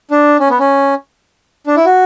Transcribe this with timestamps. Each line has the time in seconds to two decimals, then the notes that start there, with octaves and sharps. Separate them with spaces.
0.11 D4
0.40 C#4
0.50 B3
0.59 C#4
1.67 D4
1.77 E4
1.86 F#4